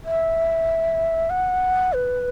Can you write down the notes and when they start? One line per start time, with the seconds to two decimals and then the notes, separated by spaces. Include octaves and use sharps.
0.05 E5
1.30 F#5
1.93 B4